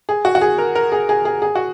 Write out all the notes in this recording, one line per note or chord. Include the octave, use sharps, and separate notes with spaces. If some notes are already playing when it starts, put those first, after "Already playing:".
G#4
F#4
F#4
G#4
A#4
A#4
G#4
G#4
G#4
G#4
F#4